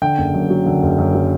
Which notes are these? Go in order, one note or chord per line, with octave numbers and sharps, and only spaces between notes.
D3 G5
F#1
F#2
F#3
D3
F#1
F#2
F#3